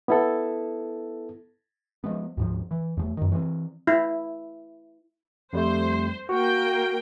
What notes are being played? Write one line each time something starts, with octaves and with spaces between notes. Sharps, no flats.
B3 E4 A4
F3 G#3 B3
D2 G#2 F3
E3
E2 F3 A3
F#2 D#3
E3 G3 C4
E4
F2 G3 A3 C5
A#3 F#4 G5